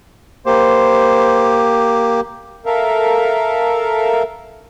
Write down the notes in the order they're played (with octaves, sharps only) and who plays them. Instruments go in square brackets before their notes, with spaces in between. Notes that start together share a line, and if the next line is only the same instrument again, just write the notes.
[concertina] A#3 G4 [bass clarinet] C5
[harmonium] A4 A#4 E5 F5